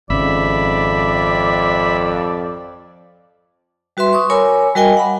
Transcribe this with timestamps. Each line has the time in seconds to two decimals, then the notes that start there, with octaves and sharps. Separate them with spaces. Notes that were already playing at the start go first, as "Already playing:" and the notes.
0.10 G#1 F2 C#3 D5 E5 B5
3.97 G3 F#4 B4 E5 C6
4.13 C#6 D#6
4.30 A#4 C#5 G#5 B5 D6 E6
4.75 G3 F#4 A#4 D#5 G5 G#5
4.95 F5 F#5 B5